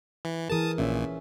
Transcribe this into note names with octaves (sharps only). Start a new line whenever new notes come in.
E3
E3 G#4 A#4 A5 D#6
A#1 A#2 C#4 E5